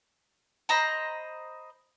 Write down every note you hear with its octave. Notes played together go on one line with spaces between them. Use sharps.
C5 D#5 A#5 B5